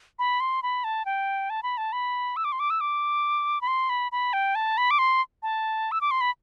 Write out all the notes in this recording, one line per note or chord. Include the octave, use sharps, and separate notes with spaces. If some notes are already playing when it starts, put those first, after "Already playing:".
B5
C6
B5
A5
G5
A5
B5
A5
B5
E6
D6
C6
D6
E6
D6
B5
C6
B5
B5
G5
A5
B5
D6
C6
A5
E6
D6
C6
B5